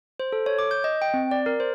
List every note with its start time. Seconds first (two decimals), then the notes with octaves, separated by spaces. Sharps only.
0.20 C5
0.32 A4
0.46 C#5
0.59 D6
0.71 G6
0.84 D#5
1.02 G5
1.14 C4
1.31 D5
1.46 A#4
1.60 C5